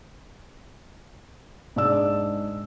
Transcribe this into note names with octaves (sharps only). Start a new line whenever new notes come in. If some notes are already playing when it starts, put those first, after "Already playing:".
G#2 G#3 D4 D5 E6